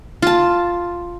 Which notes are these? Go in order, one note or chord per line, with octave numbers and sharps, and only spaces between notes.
F4 A5